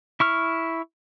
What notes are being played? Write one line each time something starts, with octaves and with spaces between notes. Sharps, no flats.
E4 C#6 F6